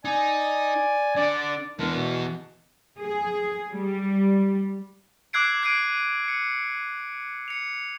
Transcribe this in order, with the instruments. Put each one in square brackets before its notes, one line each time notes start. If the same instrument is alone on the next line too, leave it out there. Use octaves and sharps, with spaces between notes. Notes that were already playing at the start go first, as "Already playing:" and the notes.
[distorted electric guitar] D#4 [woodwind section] D5 G#5
[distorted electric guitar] D3 [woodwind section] D5
[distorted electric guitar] E3 B3 [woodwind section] G#3 D4 A#4
[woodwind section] B2
[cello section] G#4
G3
[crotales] D6 E6 F#6 G#6 C7 D7
F#6 G#6 C7 D7 D#7
C#7
C#7 F7